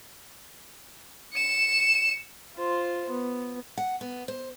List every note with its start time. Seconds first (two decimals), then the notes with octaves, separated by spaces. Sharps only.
1.34 C#7 E7
2.56 F4 C5
3.10 B3
3.78 F#5
4.01 B3
4.28 C5